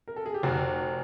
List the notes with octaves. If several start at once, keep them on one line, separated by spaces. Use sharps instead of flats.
A#4
A4
G#4
G4
F1 F#4